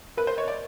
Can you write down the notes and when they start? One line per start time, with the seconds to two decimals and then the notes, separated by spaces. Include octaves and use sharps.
0.17 A#4 B4
0.27 C5
0.37 C#5 D#5
0.48 D5